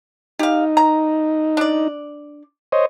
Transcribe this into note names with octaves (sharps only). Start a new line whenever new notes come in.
D#4 G4 F5
A#5
D4 D5
C5 C#5 D#5